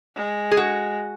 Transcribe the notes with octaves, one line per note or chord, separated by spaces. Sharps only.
G#3
G#4
F#4